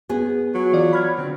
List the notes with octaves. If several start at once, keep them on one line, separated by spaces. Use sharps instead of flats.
B3 G#4
F#3
E3 F4 D5
B5 F6 G#6
D3 C4